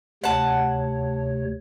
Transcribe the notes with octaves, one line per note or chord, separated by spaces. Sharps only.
D2 C3 C#5 F#5 A5